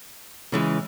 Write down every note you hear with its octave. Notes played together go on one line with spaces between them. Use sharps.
C#3 E3 G#3